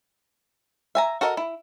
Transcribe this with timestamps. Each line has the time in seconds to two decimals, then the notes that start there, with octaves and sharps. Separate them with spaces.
0.95 E5 G#5 A#5
1.21 F#4 A4 A#4 D#5
1.37 E4